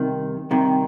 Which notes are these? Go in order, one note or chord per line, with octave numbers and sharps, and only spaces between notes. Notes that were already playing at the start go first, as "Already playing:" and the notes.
Already playing: C2 C3 D#3
C2 C3 D#3